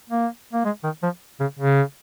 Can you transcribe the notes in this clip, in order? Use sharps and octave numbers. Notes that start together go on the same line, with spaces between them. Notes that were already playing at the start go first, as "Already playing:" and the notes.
A#3
A#3
G#3
D#3
F3
C#3
C#3